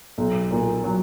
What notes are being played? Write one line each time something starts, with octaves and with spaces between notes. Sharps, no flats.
B1
A#2
F#3